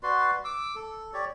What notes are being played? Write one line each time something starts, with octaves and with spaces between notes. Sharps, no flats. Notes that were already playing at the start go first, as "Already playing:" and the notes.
F#4 B4 D5 C6
D6 E6
A4
G4 C#5 D5